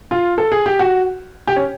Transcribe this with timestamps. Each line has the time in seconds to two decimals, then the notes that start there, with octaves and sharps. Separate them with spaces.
0.11 F4
0.38 A4
0.52 G#4
0.66 G4
0.79 F#4
1.47 G4
1.56 C#4